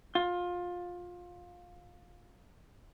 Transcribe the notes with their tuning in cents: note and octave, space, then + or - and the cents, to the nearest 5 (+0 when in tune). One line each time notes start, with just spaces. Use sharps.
F4 +20